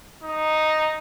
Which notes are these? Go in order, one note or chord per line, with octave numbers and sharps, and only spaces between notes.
D#4